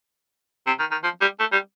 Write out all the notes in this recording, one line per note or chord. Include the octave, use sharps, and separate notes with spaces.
C3
D#3
D#3
F3
G3
A3
G3